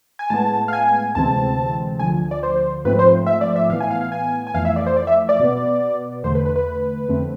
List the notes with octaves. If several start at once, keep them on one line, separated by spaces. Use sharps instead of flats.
G#5
A2 G#3 B3 A5
F5
G#5
D2 C3 E3 G#3 C4 A5
D2 D3 F3 G#5
D5
C5
G#2 F3 A3 C4 B4
C5
E5
D5
E5
A2 E3 B3 F5
G#5
F5
F5
G#5
G#5
F2 E3 A3 F5
E5
D5
C5
D5
E5
D5
B2 B3
E2 D3 A3 C5
B4
B4
B4
F2 D3 A3 C4